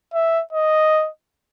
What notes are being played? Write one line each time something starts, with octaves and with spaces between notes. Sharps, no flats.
E5
D#5